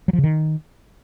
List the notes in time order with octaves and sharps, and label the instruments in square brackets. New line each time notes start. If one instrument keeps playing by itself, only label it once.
[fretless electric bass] F#3
F3
C#3
D#3